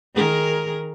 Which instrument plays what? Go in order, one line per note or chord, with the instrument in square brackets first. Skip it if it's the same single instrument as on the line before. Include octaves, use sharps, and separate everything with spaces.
[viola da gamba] D#3 G#4 A#4